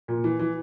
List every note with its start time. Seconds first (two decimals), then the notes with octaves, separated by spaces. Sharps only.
0.08 A#2
0.24 E3
0.39 E3